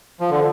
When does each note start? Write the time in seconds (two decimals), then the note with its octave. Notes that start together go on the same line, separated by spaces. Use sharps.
0.20 F3
0.30 D3